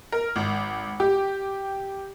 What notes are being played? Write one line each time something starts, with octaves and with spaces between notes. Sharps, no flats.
A#4
G#1
G4